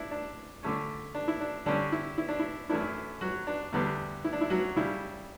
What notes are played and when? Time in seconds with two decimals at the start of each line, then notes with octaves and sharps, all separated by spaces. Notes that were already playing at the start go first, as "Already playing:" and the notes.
Already playing: D4 E4
0.11 D4
0.63 D3 A3 C#4
1.15 D4
1.28 E4
1.40 D4
1.66 D3 G3 C#4 D4
1.92 E4
2.18 E4
2.29 D4
2.39 E4
2.69 F#2 E3 A3 D4 E4
3.21 F#3 F#4
3.47 D4
3.73 E2 D3 G3 B3 D4
4.24 E4
4.33 D4
4.41 E4
4.50 F#3 F#4
4.76 C#3 G3 D4 E4